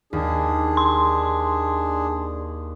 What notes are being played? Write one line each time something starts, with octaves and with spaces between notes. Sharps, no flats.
D#2 D4 G#4
C6